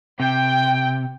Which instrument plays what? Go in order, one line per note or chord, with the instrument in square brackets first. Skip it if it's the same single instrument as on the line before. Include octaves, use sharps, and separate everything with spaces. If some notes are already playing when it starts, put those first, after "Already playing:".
[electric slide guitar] C3 [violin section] G5